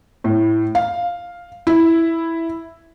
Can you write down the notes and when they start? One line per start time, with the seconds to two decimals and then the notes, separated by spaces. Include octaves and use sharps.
0.24 A2
0.75 F5
1.67 E4